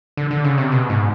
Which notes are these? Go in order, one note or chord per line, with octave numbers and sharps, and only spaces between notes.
D3
D3
C#3
C3
B2
G#2